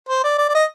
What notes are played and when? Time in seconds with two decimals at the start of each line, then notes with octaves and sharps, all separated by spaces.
0.09 C5
0.24 D5
0.38 D5
0.49 D5
0.54 D#5